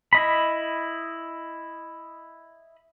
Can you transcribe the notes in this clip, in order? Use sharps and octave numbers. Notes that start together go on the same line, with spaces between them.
E4 D#5 B5